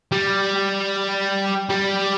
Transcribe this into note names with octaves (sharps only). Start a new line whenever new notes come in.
G3
G3